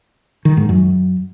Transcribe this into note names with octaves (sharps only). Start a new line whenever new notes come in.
D#3
G#2
F#2